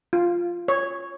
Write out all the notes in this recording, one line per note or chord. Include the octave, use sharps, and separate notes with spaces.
F4
C#5